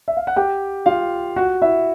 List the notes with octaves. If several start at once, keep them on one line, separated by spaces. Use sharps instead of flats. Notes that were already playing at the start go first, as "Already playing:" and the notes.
E5
F5
F#5
G4 G5
F4 F5
F#4 F#5
E4 E5